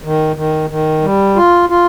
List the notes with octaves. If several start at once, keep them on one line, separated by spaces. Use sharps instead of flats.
D#3
D#3
D#3
G3
F4
F4